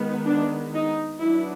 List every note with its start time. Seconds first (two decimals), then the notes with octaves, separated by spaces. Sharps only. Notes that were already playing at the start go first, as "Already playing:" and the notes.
Already playing: D#3 G#3 B3
0.27 D4
0.74 D#4
1.21 F#3 B3 D4 E4